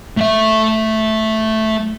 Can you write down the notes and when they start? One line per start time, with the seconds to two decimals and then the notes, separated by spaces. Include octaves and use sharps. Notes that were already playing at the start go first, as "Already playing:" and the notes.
0.17 A3 E5